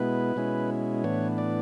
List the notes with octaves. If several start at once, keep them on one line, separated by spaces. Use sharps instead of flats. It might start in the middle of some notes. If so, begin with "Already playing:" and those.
Already playing: B2 G#3 B3 E4 B4
B2 G#3 C#4 E4
A2 E3 B3 D4 C#5
D5